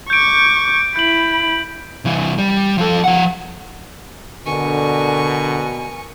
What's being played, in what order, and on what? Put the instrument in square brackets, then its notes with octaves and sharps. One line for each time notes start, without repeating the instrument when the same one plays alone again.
[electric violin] C#6 D6 [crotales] G6 D7
[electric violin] E4 B5 [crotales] G6 F#7
[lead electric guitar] C2 E3
G3
F3 A4
F3 F#5
[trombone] B2 [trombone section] D3 [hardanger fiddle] A#4 C#6 [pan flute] G#5